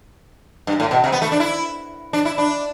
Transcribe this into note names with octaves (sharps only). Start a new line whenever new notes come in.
G2
A2
B2
C3
B3
A3
D4
E4
D4
E4
D4